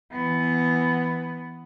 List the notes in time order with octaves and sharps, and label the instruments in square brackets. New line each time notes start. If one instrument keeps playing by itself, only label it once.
[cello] E3 B3